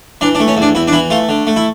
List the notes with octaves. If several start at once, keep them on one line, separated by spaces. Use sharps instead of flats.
E3 D4
D4
A3
C#4
E2
D4
E2 E4
D4
E3 E4
A3 F4
D3
A3
E4